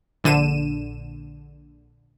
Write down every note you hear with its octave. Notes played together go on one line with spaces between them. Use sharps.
A#1 D3 D#7 E7